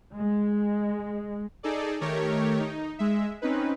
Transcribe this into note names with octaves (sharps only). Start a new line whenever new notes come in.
G#3
D#4 G#4 A4 D5
D#3 A3 G4 A#4 C#5
D#4
G#3 E5
C4 C#4 D#4 B4